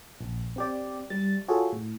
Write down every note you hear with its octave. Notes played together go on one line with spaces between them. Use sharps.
A#1
C4 G4 D5
G3 A6
F4 F#4 G#4 A4 C#5
A2